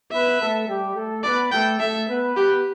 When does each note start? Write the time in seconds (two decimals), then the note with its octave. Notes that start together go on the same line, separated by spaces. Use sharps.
0.12 B3 B4 E5
0.41 A3 A4
0.67 G3 G4
0.95 A3 A4
1.24 B3 B4 D5
1.52 A3 A4 G5
1.80 A3 A4 E5
2.08 B3 B4
2.37 B3 G4 B4